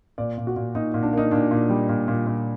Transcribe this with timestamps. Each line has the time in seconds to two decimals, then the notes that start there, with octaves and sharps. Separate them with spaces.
0.18 A#2 D5
0.38 A#2
0.47 F#4
0.56 A#2
0.75 A#2 D#4
0.94 A#2
1.03 D4
1.13 A#3 D#4
1.31 A#2 D4
1.51 A#2
1.69 G3
1.89 A#2
2.08 A#2
2.27 A#2